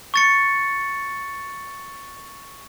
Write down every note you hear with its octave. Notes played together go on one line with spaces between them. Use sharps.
C#6 A6 C#7